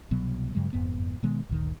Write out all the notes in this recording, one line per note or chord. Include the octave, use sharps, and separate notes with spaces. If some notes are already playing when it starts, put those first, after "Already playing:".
C2 B2 F#3 B3
G2 C#3 F#3 G#3
F#1 F2 G#2 B3
B2 D#3 G#3 B3
G1 D2 A#2 D#3